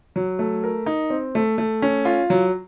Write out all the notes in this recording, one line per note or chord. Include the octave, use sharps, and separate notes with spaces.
F#3
A3
A#4
D#4
C4
A3
A3
C#4
F4
F#3